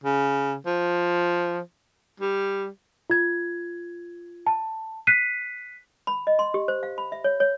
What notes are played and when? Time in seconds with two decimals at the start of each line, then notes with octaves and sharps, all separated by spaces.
0.04 C#3
0.66 F3
2.20 G3
3.10 F4 G#6
4.47 A5
5.07 F#6 B6 C7 D#7
6.07 B5
6.27 D#5
6.39 C6
6.54 G4
6.68 C5
6.83 F5
6.98 B5
7.12 E5
7.24 C#5
7.40 C#5